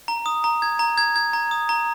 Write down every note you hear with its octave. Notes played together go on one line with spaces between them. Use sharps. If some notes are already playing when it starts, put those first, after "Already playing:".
A#5
D#6
A#5
G#6
A#5
G#6
G#6
A#5
D#6
A#5